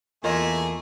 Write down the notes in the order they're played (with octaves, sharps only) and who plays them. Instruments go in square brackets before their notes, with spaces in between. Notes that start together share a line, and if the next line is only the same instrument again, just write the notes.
[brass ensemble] E2 [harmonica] A3 G#4 [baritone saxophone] A#3 [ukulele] F4 C#5 D#5